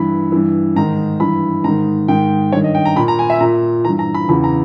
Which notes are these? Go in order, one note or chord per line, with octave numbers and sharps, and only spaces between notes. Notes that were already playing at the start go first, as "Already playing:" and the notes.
Already playing: G2 E3 B5
G2 E3
G#2 D#3 A#5
G2 E3 B5
G#2 D#3 A#5
G#2 D#3 G5
G2 D#3 C#5
D#5
G5
A#5
A#2 B5
A#5
G#5
E5
A#2 A#5
G2 E3 A#5
A#5
B5
E2 C#3 E3 B5
A#5